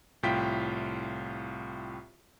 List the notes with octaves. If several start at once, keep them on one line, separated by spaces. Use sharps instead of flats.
C2 A2 F4 G5 B6